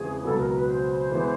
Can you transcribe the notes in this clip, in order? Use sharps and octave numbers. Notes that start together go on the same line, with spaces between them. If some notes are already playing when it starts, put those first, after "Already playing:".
Already playing: E2 C#3 F3 G#3 C4 G#4
C#2 B2 F#3 B3 A4
A#4
B4
C5
E3 G#3 B3